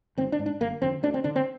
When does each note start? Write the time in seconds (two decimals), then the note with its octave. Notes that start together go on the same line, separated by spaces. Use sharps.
0.18 G#1 C4
0.32 D4
0.39 G#2
0.46 D4
0.60 G1 A#3
0.82 F2 D3 C4
1.03 D2 D4
1.14 C4
1.24 D3 D4
1.36 C4